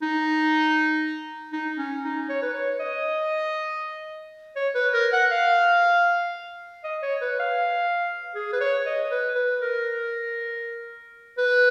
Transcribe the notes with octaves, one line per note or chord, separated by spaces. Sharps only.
D#4
D#4
C#4
D#4
C#5
B4
C#5
D#5
C#5
B4
A#4
F#5
F5
D#5
C#5
B4
F5
G#4
B4
C#5
D#5
B4
B4
A#4
B4